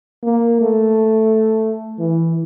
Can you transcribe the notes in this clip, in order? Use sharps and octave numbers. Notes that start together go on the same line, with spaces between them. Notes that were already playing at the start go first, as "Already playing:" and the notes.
A#3
A3
E3